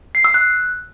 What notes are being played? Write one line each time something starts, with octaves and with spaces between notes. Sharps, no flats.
C7
E6
F#6